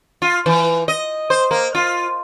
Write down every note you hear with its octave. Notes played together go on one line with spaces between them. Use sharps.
F4
E3
D#5
C5
A#3
F4